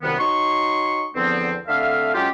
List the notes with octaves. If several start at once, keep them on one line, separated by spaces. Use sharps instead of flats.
C2 F#2 C3 D#3 B3
D#4 F#4 C#5 C6 C#6
E2 D3 F3 B3 C4
D3 A3 C4 E5 F5
F#3 G#3 C#4 F4 G4